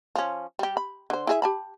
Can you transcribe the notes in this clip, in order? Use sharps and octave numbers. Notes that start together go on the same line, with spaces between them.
F3 C#4
G3 G4
B5
D3 C5
E4 G#4 E5
G4 A5 B5